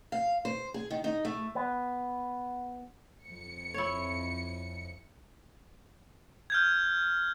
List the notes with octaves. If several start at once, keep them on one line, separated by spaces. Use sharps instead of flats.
F5
C5
G#4
D#3
D#4
A3
B3
F2 C#7
E4 C#5
F6 G6 G#6